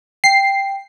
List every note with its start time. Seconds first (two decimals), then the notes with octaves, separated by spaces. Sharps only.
0.24 G5 C7